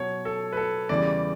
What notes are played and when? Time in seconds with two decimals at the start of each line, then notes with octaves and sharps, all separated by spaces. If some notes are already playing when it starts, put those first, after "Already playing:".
Already playing: B2 F#3 C#5
0.25 A4
0.52 B4
0.57 A4
0.89 E2 C#3 E3 G3 D5